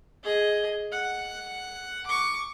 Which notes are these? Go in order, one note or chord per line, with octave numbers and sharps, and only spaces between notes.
G#4 D#5
F#5
C#6 D6